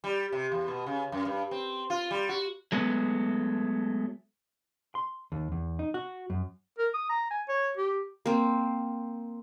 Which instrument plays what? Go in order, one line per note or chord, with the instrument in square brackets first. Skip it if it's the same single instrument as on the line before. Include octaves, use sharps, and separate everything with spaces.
[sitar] G3
C3
E2
B2
C#3
F#2
G2
C4
F4
G3
F#4
[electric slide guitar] F#3 G#3 A3 B3
[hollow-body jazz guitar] C6
D#2
E2
D#4
F#4
F#2
[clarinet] A#4
D#6
A#5
G#5
C#5
G4
[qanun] A#3 C4